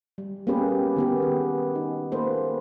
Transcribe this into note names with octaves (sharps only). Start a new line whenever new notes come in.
G3
A#3 B3 C#4 G4 G#4 B4
D#3 B3 G4
G#4
D#4
A#3 A4 B4 C5